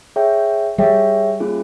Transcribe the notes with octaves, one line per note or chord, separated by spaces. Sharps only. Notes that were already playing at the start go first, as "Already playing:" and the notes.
G#4 C#5 E5 G5
G3 G#4 C#5 E5 G5
A#3 C#4 F4 G#4